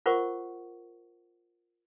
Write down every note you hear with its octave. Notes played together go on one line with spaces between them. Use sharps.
F4 A#4 C5 F#5 C#6 D6